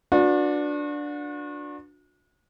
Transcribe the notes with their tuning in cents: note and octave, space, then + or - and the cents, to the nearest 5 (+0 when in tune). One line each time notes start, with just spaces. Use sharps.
D4 +0 F#4 -40 B4 +0